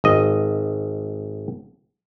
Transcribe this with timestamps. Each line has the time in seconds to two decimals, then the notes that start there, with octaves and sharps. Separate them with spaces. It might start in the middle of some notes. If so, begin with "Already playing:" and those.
0.04 G#1 D#5